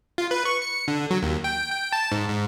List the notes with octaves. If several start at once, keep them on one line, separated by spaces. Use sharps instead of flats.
F4
B4
C#6
C#7
D3
F#3
D#2
G5
G5
A5
G#2
G#2